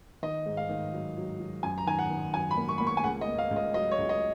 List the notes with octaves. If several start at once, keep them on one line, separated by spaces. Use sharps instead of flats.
D#3 D#5
G#2
F5
D#3
F#3
F#3
F#3
F#2 G#5
A#5
D#3 G#5
F#5
D#3
F#2 G#5
B5
A#3
C#6
A#3 B5
C#6
G#5
C#2 F#5
D#5
A#3
F5
C#2
D#5
F#3 D#5
C#5
C#2
D#5